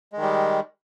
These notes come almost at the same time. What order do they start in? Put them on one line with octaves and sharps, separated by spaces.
G#3 D#3 G3